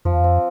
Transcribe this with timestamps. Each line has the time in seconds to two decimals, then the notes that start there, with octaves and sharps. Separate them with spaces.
0.05 F2 F3
0.13 E2
0.20 F2 C4